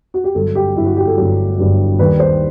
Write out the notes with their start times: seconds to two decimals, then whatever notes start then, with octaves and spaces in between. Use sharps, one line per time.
0.14 F#4
0.24 G4
0.35 G1 G2 F#3 A4
0.55 G4
0.76 G1 G2 F#3 E4
0.86 F#4
0.97 G4
1.07 A4
1.17 G1 G2 F#3
1.58 G1 G2 F#3
1.99 D#2 D#3 G3 B4
2.20 C5